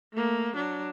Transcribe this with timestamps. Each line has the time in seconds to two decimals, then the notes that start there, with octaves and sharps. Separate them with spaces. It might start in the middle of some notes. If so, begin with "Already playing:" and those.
0.13 A3 A#3
0.56 F#3 D4